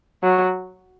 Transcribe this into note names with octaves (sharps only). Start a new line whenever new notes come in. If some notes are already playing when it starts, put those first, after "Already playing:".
F#3